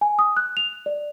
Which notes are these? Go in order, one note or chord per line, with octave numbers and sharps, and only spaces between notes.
G#5
D#6
F#6
F7
D5